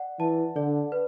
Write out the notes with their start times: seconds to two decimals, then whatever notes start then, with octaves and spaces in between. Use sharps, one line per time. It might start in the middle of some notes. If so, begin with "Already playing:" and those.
Already playing: D5 F#5
0.19 E3 A5
0.56 D3 D5
0.92 B4